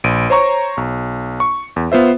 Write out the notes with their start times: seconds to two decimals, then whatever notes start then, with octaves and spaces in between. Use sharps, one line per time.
0.04 A#1 D7 D#7
0.30 C5 C#5 A#5 C#6
0.77 B1
1.40 C#6
1.76 E2
1.92 B3 F4 C5 E5